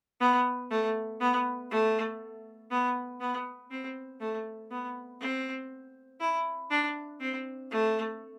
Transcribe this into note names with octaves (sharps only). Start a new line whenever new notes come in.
B3
A3
B3
A3
B3
B3
C4
A3
B3
C4
E4
D4
C4
A3